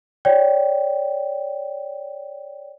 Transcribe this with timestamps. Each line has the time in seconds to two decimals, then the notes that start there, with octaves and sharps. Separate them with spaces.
0.25 C#5 D5 G5